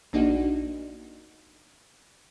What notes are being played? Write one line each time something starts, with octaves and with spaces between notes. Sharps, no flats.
A#1 A#3 D4 D#4 F#4